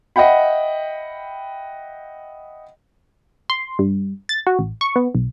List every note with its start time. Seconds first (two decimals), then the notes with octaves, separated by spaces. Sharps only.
0.16 D#5 E5 F#5 G5 B5
3.50 C6
3.79 G2
4.29 A6
4.47 F#4
4.59 A1
4.81 C#6
4.96 B3
5.15 B1